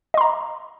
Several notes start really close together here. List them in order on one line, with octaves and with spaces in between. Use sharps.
D#5 C6 A#5